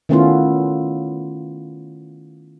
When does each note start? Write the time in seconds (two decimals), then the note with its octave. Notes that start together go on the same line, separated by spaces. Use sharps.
0.09 D#3 A3 B3 C#4 E4 F4